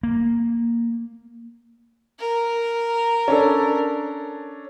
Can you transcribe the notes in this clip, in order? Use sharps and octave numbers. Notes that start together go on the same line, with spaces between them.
A#3
A#4
C#4 D4 A4